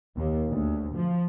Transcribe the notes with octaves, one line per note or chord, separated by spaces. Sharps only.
D#2
D2
F3